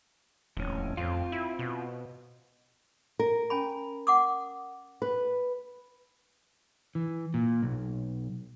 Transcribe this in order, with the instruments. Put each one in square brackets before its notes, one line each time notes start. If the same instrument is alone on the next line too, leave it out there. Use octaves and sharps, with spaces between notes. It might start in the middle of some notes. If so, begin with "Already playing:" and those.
[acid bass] D#1 [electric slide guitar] F2 A2 C#4
[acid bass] F2 [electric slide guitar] C4 F4
[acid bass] E4
B2
[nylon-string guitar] A#4
[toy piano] C#4 G#5 B5
F#5 D6 D#6
[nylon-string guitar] B4
[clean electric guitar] E3
A#2
B1